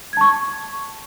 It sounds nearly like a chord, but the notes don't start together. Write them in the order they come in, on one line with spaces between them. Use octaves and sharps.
G#6 A5 C#6